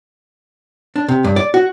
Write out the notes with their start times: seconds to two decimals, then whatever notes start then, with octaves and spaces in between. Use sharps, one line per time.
0.96 D4
1.08 C3
1.24 G2
1.36 D5
1.54 F#4